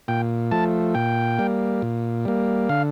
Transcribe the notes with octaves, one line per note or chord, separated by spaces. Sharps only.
A#2 G5
F3 A3 A5
A#2 G5
G3 A#3
A#2
G3 A#3
D3 F5